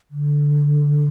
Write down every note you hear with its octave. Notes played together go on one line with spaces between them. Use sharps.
D3